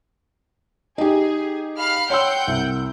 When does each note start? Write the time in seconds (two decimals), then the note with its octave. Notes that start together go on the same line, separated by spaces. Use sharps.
0.98 D#4 G4 G#4
1.79 F5 B5 F6
2.10 C#5 F#5 G5 C6 E6 G6
2.47 C2